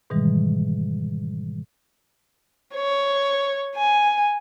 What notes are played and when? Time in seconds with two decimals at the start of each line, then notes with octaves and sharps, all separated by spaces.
0.10 G#2 B2 D#3 E3 G3 G#3
2.76 C#5
3.75 G#5